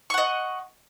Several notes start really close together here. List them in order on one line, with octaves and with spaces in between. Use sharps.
C#6 F#5 D#5